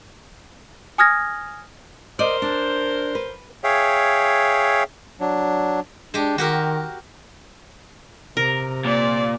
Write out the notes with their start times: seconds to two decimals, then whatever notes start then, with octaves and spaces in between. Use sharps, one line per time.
0.98 G#5 D#6 F6 G#6 A#6
2.19 A#4 C5 D5 D#5
2.42 D4
3.15 B4
3.64 G#4 C#5 E5 F5 G5
5.21 F#3 D4
6.14 G#3 D4 G4
6.38 D#3 F#4 G4 A#4
8.37 C3 A#4
8.86 A#2 D5